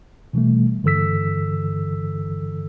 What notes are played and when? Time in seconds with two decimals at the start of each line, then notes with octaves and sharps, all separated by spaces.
0.33 B2 E3 G3 A3
0.83 G2 D3 E3 A4 E6 B6